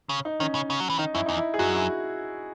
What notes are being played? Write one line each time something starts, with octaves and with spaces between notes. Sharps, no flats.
C#3
D#4
D#3 C#4
C#3
C#3
F#3
E3
D#3 D#4
F#2 E4
E2 D#4
E4
G#4
F#2 F#4
E4